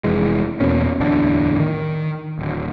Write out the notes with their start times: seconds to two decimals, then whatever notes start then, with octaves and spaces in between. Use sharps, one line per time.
0.04 F1 F2 E3 G#3
0.60 E2 B2 A#3 C#4
1.00 D1 E2 D3 D4
1.60 D#3
2.39 D1